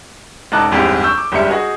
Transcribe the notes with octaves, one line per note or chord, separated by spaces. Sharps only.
E1 C#3 D#4 A5 D6 F#6
D1 G1 E2 G#2 C4 G4
C#6 E6 G6
D6
G1 C#2 G3 E5 C#7
F#4 G#4 D#5 F#5